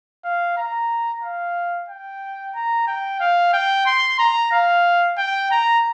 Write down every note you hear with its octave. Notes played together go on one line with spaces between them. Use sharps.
F5
A#5
F5
G5
A#5
G5
F5
G5
C6
A#5
F5
G5
A#5